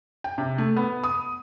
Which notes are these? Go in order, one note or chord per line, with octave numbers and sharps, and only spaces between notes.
G5
C3
A3
B3
D#6